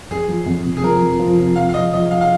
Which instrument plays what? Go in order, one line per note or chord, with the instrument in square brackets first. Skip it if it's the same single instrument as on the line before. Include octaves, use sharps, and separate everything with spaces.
[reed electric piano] F2 [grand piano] G#4
[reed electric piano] F3
F2
C3
[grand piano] G#4
[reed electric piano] F3 [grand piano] A#4
[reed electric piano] F2
F3
C3
[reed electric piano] F2 [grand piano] F5
[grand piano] F5
[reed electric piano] F2 [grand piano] D#5
[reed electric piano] F3 [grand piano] D#5
[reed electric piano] F3 [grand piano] F5
[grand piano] F5